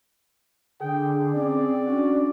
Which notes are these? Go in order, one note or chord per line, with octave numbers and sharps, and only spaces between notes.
D3 G#4 G5
C4 C#4 D5
C#4 D4 F#4